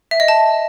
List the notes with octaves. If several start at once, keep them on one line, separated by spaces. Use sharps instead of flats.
E5
D#5
A5